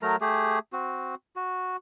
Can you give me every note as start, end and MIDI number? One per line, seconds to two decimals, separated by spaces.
0.02 0.16 54
0.02 0.16 57
0.02 0.16 70
0.02 0.16 82
0.21 0.59 57
0.21 0.59 67
0.21 0.59 68
0.73 1.15 60
0.73 1.15 66
1.36 1.77 66